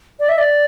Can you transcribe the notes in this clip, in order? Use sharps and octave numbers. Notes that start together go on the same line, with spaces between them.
D5
E5
D5